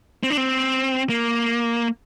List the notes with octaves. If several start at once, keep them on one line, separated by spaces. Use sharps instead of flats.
C4
D4
C4
A#3